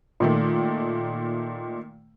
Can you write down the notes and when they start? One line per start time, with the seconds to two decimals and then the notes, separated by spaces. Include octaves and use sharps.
0.20 A#2 D#3 A3